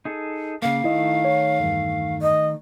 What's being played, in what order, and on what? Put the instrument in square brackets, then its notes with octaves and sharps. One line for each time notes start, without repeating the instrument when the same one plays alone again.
[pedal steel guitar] D#4 G#4 A4
[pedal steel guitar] C#3 A#3 [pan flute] F5
[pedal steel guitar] D#3 A3 [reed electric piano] E4 D#5
[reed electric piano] C#5
E2 G2
[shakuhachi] D#5